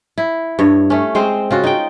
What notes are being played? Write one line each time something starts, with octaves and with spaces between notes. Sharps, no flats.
E4
G2 C#5
A3 C#4
G#3 C4 C5
C#3 F4 F#4
D#4 G5